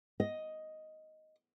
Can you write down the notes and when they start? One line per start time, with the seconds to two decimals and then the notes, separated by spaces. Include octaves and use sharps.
0.20 D#5